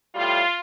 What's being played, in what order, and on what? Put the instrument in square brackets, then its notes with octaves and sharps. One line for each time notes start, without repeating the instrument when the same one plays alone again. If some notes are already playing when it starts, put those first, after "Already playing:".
[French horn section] A2 G3 F4